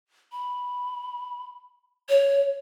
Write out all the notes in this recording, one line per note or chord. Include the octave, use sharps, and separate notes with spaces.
B5
C#5